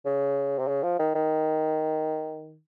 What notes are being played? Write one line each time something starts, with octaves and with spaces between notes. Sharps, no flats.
C#3
C3
C#3
F3
D#3
D#3